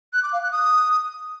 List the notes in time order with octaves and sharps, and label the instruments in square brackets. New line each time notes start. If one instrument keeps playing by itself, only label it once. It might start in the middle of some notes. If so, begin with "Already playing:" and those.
[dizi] F#6
D6
F5
F#6
D#6